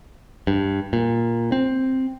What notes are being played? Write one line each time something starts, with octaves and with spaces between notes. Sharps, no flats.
G2
A#2
C4